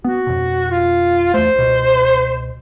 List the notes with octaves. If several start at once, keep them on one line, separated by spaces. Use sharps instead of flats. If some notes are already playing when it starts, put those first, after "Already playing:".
B3 F#4
F2 B2
F4
E2 A3 C5
C#2 B2